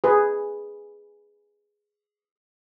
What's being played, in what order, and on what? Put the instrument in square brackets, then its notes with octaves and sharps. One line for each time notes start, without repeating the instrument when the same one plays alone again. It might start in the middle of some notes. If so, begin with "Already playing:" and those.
[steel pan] G#4 B4